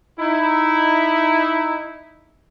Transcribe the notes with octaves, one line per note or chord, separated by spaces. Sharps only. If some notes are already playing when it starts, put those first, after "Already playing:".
D#4 E4